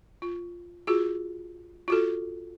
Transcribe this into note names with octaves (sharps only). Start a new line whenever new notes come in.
F4
F4 F#4 G#4
F4 F#4 A4